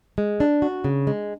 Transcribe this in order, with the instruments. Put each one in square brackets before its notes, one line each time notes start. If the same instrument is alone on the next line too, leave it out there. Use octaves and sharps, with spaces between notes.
[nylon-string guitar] G#3
D4
F#4
C#3
G#3